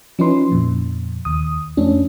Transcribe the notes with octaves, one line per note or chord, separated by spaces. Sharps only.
F3 C#4 D#4 E4 B4 C6
F2 A#2
D#2 D#6
F2 A3 C#4 D4